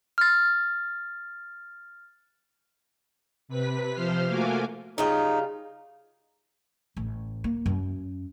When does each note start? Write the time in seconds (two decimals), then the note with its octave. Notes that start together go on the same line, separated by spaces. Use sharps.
0.18 F6 A6
3.48 C3 B4 B6
3.94 C3 F3 C5 C6 F6
4.28 A3 A#3 F4 F#4 G#5 D6
4.98 C#3 G3 D#4 F4
6.97 A1
7.44 A#3
7.66 F#2